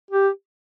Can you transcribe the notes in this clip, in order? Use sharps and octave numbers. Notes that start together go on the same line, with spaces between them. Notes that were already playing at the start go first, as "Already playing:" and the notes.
G4